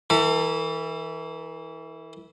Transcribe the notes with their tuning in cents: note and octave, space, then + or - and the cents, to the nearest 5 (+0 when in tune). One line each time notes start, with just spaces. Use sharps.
E3 -20 A4 +40